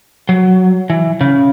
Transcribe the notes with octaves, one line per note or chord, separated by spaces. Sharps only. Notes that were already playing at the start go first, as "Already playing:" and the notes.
F#3
E3
C#3